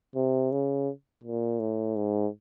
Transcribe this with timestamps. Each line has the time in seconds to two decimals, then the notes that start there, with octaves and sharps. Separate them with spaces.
0.16 C3
0.52 C#3
1.23 A#2
1.59 A2
1.96 G#2